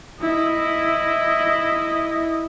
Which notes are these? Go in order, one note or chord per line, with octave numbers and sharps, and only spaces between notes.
E4 D#5